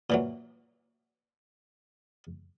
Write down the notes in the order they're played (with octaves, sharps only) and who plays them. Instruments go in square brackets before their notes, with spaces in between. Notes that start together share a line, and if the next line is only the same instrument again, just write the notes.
[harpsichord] A#2 E3 F#3